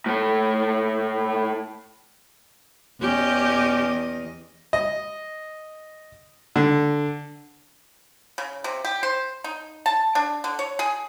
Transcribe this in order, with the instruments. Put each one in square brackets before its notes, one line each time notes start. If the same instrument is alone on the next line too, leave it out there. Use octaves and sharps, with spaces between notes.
[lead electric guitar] A2 A3
[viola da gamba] E2 D#5 [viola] C#4 G4
[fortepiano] D#5
D3
[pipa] C#3
C3
G4
C5
D#4
A5
D4
D3
C#5
G#4